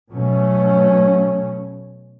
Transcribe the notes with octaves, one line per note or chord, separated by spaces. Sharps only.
B2 F#3 A3 C#4